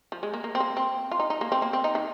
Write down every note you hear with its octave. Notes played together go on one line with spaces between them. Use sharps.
F3
G#3
A#3
A#3
C4
A#3
C4
F4
D#4
D#4
A#3
C4
A#3
C4
D#4
D#3